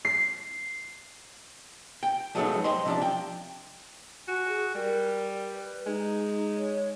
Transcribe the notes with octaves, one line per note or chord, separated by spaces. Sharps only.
C7
G5
F3 F#3 G#3 A3 B3 D#4
C5 D#5 G5 C6
C3 F3 D4
G5
F#4 G#5
G#4
G3 A#4
B4
G#3 D#4
C#5